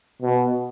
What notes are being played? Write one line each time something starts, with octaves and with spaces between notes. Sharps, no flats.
B2